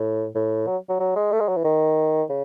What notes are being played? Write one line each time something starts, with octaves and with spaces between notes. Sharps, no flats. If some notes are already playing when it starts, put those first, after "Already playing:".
Already playing: A2
A2
F#3
F#3
F#3
G#3
A3
G#3
F#3
E3
D#3
C#3